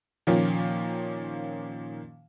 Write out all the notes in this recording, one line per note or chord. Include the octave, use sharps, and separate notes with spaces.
A#2 D#3 F3 A#3 C#4 F4